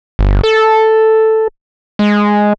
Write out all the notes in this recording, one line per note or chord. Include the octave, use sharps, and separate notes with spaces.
G1
A4
G#3